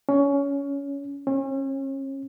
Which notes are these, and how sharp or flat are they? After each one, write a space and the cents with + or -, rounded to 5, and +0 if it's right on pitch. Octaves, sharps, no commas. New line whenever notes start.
C#4 +20
C#4 -35